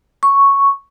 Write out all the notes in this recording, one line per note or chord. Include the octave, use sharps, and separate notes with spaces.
C#6